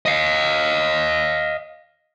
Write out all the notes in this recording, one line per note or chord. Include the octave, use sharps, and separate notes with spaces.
D#5 F5